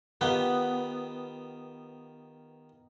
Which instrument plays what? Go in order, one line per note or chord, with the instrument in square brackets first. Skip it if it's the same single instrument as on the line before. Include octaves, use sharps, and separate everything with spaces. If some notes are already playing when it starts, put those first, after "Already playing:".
[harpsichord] D#3 F4 G4 [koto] B3